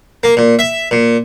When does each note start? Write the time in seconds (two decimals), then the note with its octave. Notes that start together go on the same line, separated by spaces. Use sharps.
0.23 A#3
0.37 A#2
0.59 E5
0.91 A#2